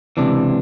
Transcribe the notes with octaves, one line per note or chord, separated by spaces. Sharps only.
C#2 C3 E3 D4